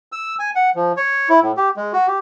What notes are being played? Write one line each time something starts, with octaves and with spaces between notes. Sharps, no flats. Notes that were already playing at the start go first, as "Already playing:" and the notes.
E6
G#5
F#5
F3
C#5
E4
A2
G4
G#3
F#4
G4